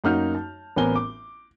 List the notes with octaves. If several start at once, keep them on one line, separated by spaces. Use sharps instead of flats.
F#2 A#3 D#4 F#4 F6 G6
A5
A1 B3 C4 A#4 G#5 G7
D6